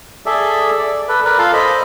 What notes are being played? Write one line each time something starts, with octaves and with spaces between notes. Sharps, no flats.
G#4 A4 D5 E5
D5
A4 B4
A#4 B4 D5
F4 A4 F5
C5 D#5 B5